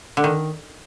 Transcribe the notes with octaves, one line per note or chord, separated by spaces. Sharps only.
D3
D#3